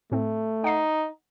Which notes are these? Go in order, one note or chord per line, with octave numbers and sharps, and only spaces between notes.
A2 A3 C4
D#4 F#5 C7